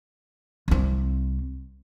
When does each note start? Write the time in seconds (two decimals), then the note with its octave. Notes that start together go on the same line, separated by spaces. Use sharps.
0.68 C2 C4